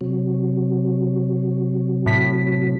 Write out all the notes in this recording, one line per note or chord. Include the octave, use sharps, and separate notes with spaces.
C3 F#3
A2 B6